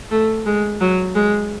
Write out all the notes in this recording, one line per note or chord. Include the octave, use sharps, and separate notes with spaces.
A3
G#3
F#3
G#3